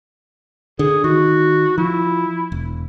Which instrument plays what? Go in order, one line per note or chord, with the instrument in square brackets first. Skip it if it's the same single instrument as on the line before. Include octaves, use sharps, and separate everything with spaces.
[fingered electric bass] D3 [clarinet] G#4
[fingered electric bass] D#3 [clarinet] F#4
[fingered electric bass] F3 [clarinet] E4
[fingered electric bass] E1